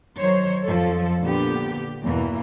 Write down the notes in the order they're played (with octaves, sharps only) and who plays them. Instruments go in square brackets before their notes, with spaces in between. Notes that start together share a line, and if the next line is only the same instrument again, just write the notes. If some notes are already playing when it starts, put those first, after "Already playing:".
[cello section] D#3 F#3 C5 C#5
F2 F3 A4
A#2 D3 B3 G4
E2 G2 B2 E3 A#3